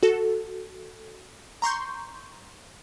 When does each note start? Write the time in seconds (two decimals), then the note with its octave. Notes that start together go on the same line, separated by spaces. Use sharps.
0.03 F#4 A4
1.62 A#5 C6 C#6 G6